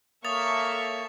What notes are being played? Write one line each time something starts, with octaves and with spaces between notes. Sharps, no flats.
A#3 A4 C#5 E5 C#6 D#6 A6 F7